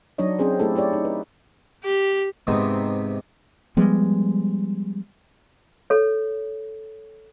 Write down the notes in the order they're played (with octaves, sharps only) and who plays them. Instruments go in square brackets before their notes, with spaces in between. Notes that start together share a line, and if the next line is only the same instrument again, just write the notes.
[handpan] F#3 D4 D#4 C#5 D#5
C4 C#4 G#4 C5
A3 E4 G4 A4
E4 G4 C#5 D5
D#4
B4
[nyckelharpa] G4
[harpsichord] G#2 C3 B3 C4 D#4
[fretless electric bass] F3 G3 G#3 B3
[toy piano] A4 C#5